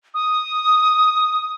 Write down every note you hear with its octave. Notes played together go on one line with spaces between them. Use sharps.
D#6